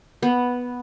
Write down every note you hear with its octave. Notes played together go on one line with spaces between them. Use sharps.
B3